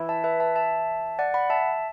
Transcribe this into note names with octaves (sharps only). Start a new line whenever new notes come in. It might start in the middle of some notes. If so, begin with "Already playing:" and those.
Already playing: E3 E4
E5 A5
B4 E5
E5 A5
E5 A5
D5 F#5
F#5 B5
E5 A5